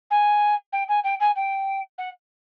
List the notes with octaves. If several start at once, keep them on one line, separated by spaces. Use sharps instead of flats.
G#5
G5
G#5
G5
G#5
G5
F#5